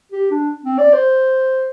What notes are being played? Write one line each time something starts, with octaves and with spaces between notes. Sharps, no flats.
G4
D4
C4
D5
C5